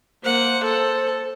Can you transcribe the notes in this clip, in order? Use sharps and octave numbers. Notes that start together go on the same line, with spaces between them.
A#3 C5 F#5
A4